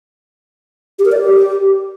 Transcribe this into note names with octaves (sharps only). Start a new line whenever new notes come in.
G4
A#4
D5
G4